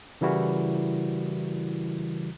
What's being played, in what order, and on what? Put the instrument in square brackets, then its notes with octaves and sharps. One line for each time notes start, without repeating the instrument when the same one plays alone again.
[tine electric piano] C#3 E3 G3 E4 F#4 A#4